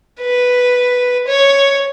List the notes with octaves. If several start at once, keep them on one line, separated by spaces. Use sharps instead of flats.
B4
C#5